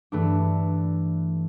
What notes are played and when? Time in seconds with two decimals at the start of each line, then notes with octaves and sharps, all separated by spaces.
0.12 G2 E3 A3 D4